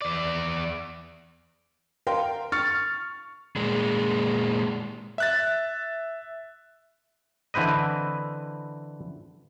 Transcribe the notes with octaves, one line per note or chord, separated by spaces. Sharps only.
E2 D5
A#4 F5 G5 C6
C#6 F6 A6 C#7
A#2 G#3
E5 F#6 A6
D3 E3 C4 B4 D#5